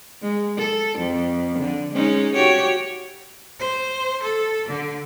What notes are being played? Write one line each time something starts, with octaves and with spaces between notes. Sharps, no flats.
G#3
A4
F2
D3
G#3 C#4 D#4
F#4 G4 C#5
C5
A4
D3